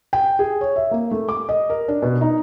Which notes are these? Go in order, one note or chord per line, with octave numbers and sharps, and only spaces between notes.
G5
G#4
C#5
E5
A#3
A3
D6
D#5
A#4
D4
B2
D#4